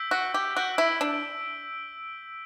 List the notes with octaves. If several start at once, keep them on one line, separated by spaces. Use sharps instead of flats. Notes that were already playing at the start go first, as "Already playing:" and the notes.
Already playing: E6 G6 B6 D7 G7
F#4
G4
F#4 E6 G6 B6 D7 G7
E4
D4